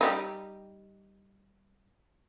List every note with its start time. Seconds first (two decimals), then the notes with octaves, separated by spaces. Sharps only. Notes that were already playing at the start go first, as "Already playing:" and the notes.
0.01 G3 D#4